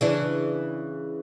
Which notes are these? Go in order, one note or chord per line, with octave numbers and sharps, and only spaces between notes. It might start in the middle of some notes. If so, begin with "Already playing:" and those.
C#3 E3 D4